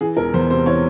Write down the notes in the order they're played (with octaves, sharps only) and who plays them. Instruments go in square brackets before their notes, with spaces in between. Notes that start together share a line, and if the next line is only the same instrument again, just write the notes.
[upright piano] E3 G#4
E1 A#4
E2 C5
C3 C5
E3 C#5